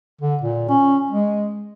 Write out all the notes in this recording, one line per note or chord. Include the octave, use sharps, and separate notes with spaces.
D3
A#2
C#4
G#3